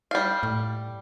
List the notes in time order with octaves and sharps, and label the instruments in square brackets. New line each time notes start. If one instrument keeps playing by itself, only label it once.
[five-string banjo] G3 F5
[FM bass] A2